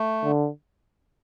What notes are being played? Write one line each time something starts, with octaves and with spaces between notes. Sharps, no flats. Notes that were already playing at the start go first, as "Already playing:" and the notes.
Already playing: A3
D3